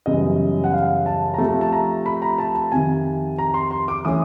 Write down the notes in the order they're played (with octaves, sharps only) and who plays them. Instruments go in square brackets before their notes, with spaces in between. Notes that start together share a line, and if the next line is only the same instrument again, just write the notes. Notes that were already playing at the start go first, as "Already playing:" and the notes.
[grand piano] F#2 C#3 E3 G3 B3 D#5
F#5
F5
A5
A#5
C3 F3 A3 A5
A5
A#5
B5
A#5
A5
A5
F2 C3 D#3 G#5
A#5
C6
C6
D6
E3 A3 C#4 D#6